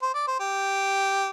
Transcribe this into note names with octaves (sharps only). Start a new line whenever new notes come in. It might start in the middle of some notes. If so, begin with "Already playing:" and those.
C5
D5
C5
G4